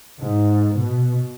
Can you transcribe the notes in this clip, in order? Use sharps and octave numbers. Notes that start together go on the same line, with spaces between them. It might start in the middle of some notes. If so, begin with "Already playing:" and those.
G#2
B2